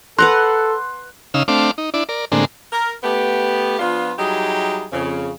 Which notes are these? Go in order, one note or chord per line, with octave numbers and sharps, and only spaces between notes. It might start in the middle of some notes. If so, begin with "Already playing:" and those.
A4 B4 F#5 A#5 C6 F#6
C#3 D#4 F5 E6
A3 C4 D4 F5 D6
D#4
D4 E4 D5
A#4 D5
A2 D3 G#3 A#3 C4 D4
A#4
A3 B3 G4
F3 B3 D4 F4
F#3 G3 D#4 E4 G4 G#4
F2 C#3